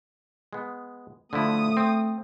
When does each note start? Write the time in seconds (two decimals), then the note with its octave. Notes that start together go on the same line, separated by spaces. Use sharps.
0.53 G#3 B3
1.33 D3 F3 A3 E4 D#6
1.77 C4